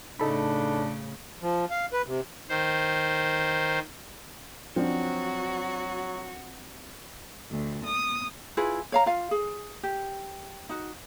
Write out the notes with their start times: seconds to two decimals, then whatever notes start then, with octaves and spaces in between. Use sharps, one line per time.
0.20 A2 C#3 D4 D#4 A4 B5
1.42 F3
1.70 F5
1.93 B4
2.06 C3
2.49 D#3 C5
4.76 F3 F#3 C4 D4 F#4
7.51 D2
7.85 D#6
8.57 E4 F4 G#4 B4
8.92 C#5 F5 A#5
9.06 F4 F5
9.31 G#4
9.83 G4
10.69 D#4 F#4